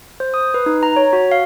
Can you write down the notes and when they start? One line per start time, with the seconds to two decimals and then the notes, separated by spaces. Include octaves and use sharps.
0.20 C5
0.34 D#6
0.54 B4
0.66 D#4
0.83 A#5
0.96 C#5
1.13 F#4
1.32 F5